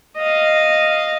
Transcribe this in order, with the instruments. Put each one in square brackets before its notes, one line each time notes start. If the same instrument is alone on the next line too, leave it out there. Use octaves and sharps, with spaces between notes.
[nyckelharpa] D#5 F5